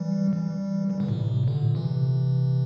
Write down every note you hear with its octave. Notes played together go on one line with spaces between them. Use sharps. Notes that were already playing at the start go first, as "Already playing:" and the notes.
Already playing: E3 G3
E3 G3
E3 G3
A#2 D3
A2 C3
A#2 D3
C3 E3